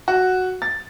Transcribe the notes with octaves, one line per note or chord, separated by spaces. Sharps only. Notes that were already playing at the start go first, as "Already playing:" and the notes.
F#4
A6